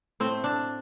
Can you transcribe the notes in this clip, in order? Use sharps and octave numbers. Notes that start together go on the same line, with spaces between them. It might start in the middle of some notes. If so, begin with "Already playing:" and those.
A2 A3 C4
D4